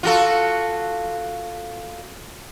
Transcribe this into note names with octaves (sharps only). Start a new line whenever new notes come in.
F4 F#4 A4